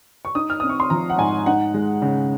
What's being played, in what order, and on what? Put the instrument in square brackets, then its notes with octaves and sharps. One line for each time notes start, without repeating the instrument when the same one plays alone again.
[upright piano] C#6
D#4 D#6
F6
C4 D#6
C#6
C6
F3 A#5
F#5
G#2 G#5
D#4 F#5
G#3
C#3